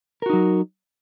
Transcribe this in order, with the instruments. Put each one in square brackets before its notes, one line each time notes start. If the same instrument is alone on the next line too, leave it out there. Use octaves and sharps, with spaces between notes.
[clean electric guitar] A#4
F#4
D#4
F#3